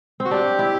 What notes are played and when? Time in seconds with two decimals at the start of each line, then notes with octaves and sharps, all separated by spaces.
0.20 C4
0.25 F#4
0.31 D4 G4
0.59 E4